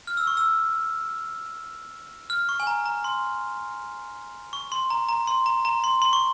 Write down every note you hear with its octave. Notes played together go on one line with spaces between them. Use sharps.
F6
E6
C#6
E6
F6
C#6
G#5
A#5
A#5
C6
C#6
C6
A#5
A#5
C6
A#5
A#5
C6
C6
C#6